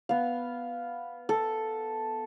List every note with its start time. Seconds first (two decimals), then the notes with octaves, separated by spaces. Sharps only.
0.09 B3 F5
1.29 A4